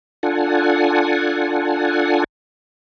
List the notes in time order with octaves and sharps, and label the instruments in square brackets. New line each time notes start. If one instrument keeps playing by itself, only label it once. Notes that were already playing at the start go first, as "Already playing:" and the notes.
[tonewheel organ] D4 F4 A4 F#5 G#5